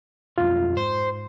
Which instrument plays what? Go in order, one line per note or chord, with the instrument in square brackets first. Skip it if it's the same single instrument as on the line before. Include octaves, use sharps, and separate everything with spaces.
[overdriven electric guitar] B1 F2 [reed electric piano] F4
[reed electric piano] G#2 [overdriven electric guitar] C5